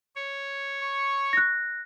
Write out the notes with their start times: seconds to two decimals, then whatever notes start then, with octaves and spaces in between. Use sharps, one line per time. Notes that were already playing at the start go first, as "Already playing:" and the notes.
0.16 C#5
0.81 C#6
1.33 F#6 A#6